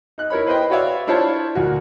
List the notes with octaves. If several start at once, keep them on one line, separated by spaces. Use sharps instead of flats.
D#4 F#6
E4 A#4 C#5 B5
B4 C5 D#5 G5
F#4 B4 C#5 D5 E5 F5
D4 E4 F4 C5 C#5 A5
D2 A#2 F#4